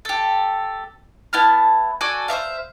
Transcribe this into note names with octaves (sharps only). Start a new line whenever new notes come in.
G4 A4
B3 E4 A5 F6
F#4 A4 D5 G#5
C5 D5 E5 F5